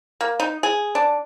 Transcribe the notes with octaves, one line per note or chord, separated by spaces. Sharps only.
A#3
D#4
G#4
D4